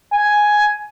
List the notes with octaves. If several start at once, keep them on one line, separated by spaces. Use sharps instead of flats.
G#5